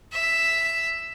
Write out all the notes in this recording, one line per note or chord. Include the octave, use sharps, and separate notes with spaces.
E5